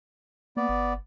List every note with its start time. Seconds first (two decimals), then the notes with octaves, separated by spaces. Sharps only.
0.57 A#3 B3 D5
0.69 G1